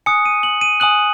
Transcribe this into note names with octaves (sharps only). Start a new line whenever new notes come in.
G#5 D#6 F#6 C#7
D#7
F#7
D#7
G#5 D#6 F#6 F#7